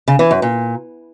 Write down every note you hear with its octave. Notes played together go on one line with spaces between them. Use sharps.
C#3
E3
F#2
A#2